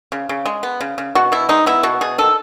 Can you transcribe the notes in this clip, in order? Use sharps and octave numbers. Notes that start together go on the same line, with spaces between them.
C#3
C#3
G#3
B3
C#3
C#3
B2 F#4
B2 E4
G#3 D#4
B3 E4
B2 F#4
B2 G#4
D#3 A4